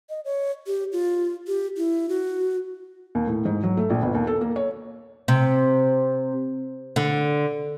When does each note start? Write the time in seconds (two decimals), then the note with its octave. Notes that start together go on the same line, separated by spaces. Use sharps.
0.10 D#5
0.25 C#5
0.67 G4
0.92 F4
1.47 G4
1.77 E4
2.09 F#4
3.15 D#2
3.28 A2
3.45 G#2
3.63 F#3
3.77 A3
3.90 A#1
4.02 G1
4.15 D#2
4.27 A4
4.41 A#3
4.56 C#5
5.28 C3
6.96 D3